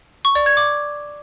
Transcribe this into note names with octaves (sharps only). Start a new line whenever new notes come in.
C#6
D5
G#6
D6